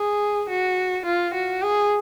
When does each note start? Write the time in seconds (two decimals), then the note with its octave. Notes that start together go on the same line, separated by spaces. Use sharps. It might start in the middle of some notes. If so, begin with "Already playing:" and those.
Already playing: G#4
0.50 F#4
1.06 F4
1.34 F#4
1.62 G#4